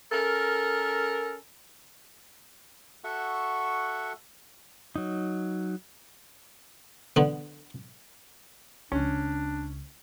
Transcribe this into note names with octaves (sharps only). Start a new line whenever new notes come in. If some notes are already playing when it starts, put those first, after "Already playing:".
C#4 A4 A#4
F#4 A4 E5 F#5 C#6
F#3 D#4
D3 B3
C#2 C#4 D4